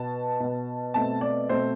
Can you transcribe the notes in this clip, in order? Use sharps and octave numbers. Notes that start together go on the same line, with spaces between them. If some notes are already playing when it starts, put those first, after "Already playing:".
Already playing: B2 B3 A5
B2 B3
B2 A3 C4 A5
D5
B2 A3 C4 C5